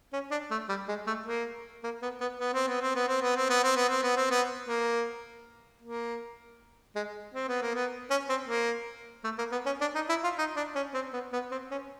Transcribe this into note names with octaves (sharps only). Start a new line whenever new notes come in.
C#4
D4
A3
G3
G#3
A3
A#3
A#3
B3
B3
B3
C4
B3
C4
B3
C4
B3
C4
B3
C4
B3
C4
B3
C4
B3
A#3
A#3
G#3
C4
B3
A#3
B3
C#4
C4
A#3
A3
A#3
B3
C#4
D4
D#4
E4
F4
D#4
D4
C#4
C4
B3
B3
C4
C#4